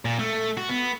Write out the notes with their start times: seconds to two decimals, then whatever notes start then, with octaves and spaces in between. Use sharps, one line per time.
0.05 A#2
0.19 A3
0.57 F#4
0.69 B3